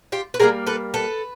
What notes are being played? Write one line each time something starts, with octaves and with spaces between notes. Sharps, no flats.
F4 G4
B4
D3 G3 A#3 G#4 A#4
A4 B4
A4 B4